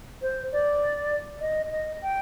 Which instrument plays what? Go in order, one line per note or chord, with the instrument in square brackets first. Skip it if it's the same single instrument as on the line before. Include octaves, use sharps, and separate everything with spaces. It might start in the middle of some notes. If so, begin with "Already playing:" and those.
[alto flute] C5
D5
D#5
D#5
G5